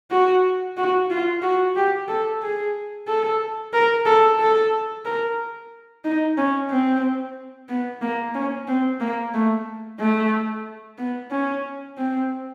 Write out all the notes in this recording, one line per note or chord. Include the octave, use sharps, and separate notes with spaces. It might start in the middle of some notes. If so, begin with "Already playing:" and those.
F#4
F#4
F4
F#4
G4
A4
G#4
A4
A#4
A4
A4
A#4
D#4
C#4
C4
B3
A#3
C#4
C4
A#3
A3
A3
B3
C#4
C4